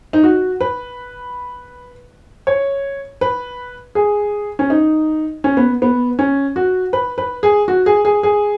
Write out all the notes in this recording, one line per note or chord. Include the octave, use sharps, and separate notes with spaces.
D#4
F#4
B4
C#5
B4
G#4
C#4
D#4
C#4
B3
B3
C#4
F#4
B4
B4
G#4
F#4
G#4
G#4
G#4